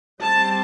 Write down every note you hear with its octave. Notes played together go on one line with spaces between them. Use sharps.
G3 C4 A5